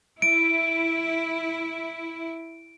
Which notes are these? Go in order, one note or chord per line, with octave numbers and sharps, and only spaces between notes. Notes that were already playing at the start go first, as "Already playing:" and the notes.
E4 D7